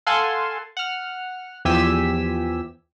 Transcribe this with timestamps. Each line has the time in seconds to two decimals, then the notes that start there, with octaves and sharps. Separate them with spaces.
0.07 A4 F5 F#5 G#5 A5 C6
0.77 F#5 F6
1.65 E2 F3 G4 G#5 E6 B6